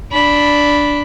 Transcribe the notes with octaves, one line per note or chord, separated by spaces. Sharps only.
D4 B5